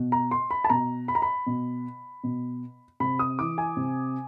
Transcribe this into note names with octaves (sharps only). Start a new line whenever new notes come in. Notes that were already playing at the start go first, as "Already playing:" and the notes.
Already playing: B2
A#5
C6
B5
A5
B2 A#5
B5
A#5
B5
B2
B2
C3 B5
D#6
E3 D6
G#5
C3